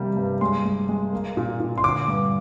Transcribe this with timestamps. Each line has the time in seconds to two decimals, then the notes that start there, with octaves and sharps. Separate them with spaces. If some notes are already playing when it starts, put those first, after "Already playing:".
Already playing: C3 G3 A#3
0.17 G2
0.41 G#3 C6
0.65 G#3
0.89 G#3
1.13 A#3
1.37 A#2
1.60 A#2
1.78 C6
1.84 D3 D6
2.08 G2